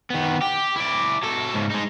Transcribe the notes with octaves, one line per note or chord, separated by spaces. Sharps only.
D#3 B3
G4
E4 D5
F#3 A4
G#2 C#3
G#3 D#4